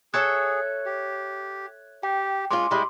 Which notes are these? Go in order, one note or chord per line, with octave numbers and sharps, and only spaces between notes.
G#4 A4 C#5 E5 F#6 G#6
G4
G4 G5
G#3 C#4 F4 C6 D6
G3 G#3 E4 D#5 B5